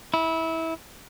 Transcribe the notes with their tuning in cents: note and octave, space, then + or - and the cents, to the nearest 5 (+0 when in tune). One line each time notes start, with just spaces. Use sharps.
E4 -20